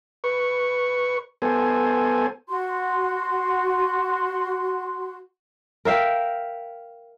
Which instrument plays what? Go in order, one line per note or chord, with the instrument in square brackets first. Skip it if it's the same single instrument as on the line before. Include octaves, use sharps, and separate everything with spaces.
[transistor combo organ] B4 C#6
B3 A4 C5 G#5
[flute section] F#4 C6
[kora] A#4 E5 F5 G5